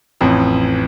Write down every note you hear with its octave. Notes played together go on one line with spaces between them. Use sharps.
A1 F2